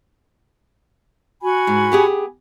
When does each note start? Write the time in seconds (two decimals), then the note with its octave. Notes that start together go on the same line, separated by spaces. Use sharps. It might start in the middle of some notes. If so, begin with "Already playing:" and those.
1.42 F#4 G#5 B5
1.67 G#2
1.92 B3 G4 G#4